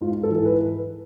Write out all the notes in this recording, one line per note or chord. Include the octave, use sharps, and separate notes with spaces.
G#2 F4
A4
E3
B4